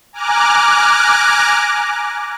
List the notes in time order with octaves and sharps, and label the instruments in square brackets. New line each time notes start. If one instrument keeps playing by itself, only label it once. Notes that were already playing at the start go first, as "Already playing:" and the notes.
[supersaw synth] G#5 A#5 D6 F6 F#6